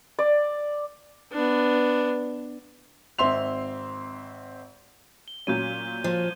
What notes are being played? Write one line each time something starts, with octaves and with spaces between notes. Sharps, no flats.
D5
B3 D4
G#1 C4 E5 C6 F7
G7
A#2 F#3 C#4 G6 G#6 D#7
F3